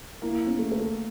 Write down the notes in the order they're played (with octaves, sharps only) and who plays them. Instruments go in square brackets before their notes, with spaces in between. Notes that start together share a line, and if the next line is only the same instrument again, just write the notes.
[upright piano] A#3 [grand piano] E4
[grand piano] C#4
[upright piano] A3
[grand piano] A4